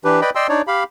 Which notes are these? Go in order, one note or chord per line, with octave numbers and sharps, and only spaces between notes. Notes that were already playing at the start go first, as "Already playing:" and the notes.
E3 D4 G4 B4
B4 D5 D#5 G5 B5
D5 D#5 G5 C6 E6
D4 D#4 C#5 D5
G4 F5 B5